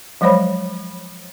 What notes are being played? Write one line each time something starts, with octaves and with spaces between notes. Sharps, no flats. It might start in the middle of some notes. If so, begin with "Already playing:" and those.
F3 F#3 G#3 C5 C#5 B5